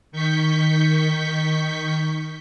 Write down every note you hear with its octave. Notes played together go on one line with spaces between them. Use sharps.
D#3 C#6 G6 B6